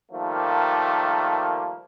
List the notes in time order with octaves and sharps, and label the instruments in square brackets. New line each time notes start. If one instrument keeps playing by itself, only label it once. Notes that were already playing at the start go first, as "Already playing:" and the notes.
[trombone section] D#3 F3 G3 A3 A#3